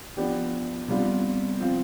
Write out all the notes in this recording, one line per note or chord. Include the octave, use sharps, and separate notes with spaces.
F3 B3 D4 G4
C3 G3 B3 D4 F4
F3 C4 F4